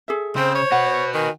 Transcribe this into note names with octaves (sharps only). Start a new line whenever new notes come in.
G#4 A4 E5
C#3 C4 C5
C#5
F#4 B4 F#5
D#3 G#5